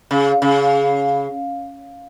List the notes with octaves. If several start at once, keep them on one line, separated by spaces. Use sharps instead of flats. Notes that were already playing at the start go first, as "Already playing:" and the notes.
C#3
C#3